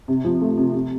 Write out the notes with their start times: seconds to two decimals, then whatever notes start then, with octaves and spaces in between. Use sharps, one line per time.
0.08 C3
0.25 F3
0.41 A3
0.58 C3
0.75 C3